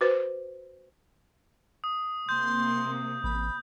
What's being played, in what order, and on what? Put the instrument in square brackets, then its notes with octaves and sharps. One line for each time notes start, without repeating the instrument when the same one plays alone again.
[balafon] F#4 B4 C5
[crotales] D#6
[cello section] C3 A#3 [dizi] C6 [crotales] G6
[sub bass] A1 [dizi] B5